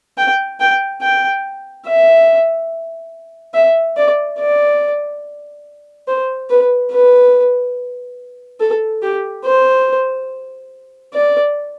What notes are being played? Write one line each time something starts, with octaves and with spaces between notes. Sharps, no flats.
G5
G5
G5
E5
E5
D5
D5
C5
B4
B4
A4
G4
C5
D5